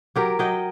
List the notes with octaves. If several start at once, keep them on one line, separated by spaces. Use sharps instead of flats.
F#3 G4 A#4
F#3 D#5 G5